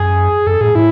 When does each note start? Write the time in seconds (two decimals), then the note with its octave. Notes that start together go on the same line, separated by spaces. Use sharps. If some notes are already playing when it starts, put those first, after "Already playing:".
Already playing: F#2 G#4
0.46 F#2 A4
0.61 A2 G#4
0.75 A2 E4